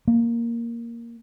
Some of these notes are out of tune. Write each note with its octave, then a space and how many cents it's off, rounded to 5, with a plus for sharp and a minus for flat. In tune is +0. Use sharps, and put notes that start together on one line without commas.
A#3 +0